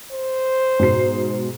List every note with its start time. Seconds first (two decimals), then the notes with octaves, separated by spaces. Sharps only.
0.12 C5
0.79 G#2 B2 C7